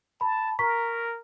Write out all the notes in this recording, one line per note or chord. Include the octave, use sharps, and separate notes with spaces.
A5 B5
A#4 A#5 C#6 B6